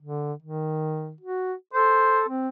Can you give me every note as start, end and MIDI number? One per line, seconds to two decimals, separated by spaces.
0.02 0.33 50
0.42 1.14 51
1.21 1.53 66
1.73 2.27 69
1.73 2.23 72
2.29 2.49 60